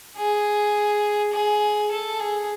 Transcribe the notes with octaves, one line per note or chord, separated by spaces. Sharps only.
G#4
G#4
A4
G#4